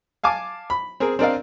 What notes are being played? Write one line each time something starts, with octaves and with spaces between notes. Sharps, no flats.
F5 G#5 A5 D6
B5
C4 G#4 A#4
C4 D4 A#4 D5 D#5 F5